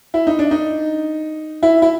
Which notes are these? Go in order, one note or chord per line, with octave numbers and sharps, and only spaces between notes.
E4
D#4
D4
D#4
E4
E4